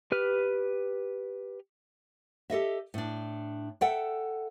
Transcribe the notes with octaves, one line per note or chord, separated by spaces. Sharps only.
G4 B4 F6
G4 A4 D#5 E5
A2 D4
A4 E5 F#5 G5